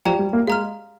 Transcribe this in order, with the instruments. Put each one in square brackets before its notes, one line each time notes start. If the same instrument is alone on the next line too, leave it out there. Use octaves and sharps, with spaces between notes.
[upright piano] F3 [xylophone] G4 D5 G5 A#5
[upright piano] G3
A#3
[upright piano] G#3 [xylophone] F5 A#5 F6